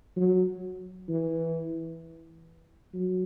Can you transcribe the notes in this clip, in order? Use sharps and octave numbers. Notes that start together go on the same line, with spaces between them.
F#3
E3
F#3